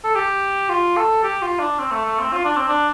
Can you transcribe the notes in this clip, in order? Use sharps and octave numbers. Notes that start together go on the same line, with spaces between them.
A4
G4
F4
A4
G4
F4
D4
C4
A3
A3
C4
F4
D4
C4
D4